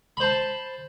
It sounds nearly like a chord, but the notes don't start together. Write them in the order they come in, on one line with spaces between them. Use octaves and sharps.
B5 C5 A5